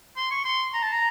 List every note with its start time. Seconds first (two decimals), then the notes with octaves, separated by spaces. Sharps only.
0.17 C6
0.31 C#6
0.45 C6
0.74 A#5
0.82 A5
0.92 A#5